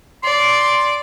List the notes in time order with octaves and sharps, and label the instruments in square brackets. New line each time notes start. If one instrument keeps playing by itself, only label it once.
[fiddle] D5 [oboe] C6